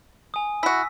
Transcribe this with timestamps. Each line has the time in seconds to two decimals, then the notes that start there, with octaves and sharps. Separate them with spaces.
0.34 G#5 D#6
0.63 E4 F#4 E6 B6